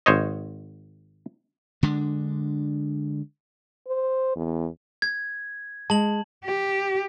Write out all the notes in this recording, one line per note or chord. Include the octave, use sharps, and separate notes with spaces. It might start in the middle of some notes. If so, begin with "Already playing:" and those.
G#1 C5 C#5 D#5
D3 G#3 D4
C5
E2
G#6
G#3 A5 F#7
G4